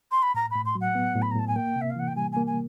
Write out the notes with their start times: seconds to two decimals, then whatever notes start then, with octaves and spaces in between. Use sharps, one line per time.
0.11 C6
0.22 B5
0.34 A2 A#5
0.51 A2 B5
0.65 C6
0.75 F#3
0.81 F#5
0.95 B3
1.15 A2
1.22 B5
1.31 A#5
1.36 A2 A5
1.47 G#5
1.56 A#3 G5
1.76 C3
1.81 E5
1.90 F5
1.96 E3 F#5
2.07 G5
2.16 G3 G#5
2.32 A#3 G#5
2.46 G#5